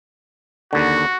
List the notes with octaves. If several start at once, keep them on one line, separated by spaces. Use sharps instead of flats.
D#2 D3 F#4